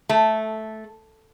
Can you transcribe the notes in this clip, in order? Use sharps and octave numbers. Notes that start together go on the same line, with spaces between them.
A3